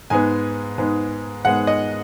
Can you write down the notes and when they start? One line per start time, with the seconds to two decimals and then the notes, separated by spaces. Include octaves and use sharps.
0.10 G#2 G#3 B3 G#5
0.78 G#2 G#3 B3
1.45 G#2 G#3 B3 F#5
1.67 D#5